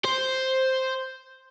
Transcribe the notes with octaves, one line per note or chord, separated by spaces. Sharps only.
C5